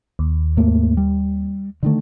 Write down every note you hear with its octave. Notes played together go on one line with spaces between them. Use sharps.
D#2
G#2 A3 A#3
G3
D3 D#3 A3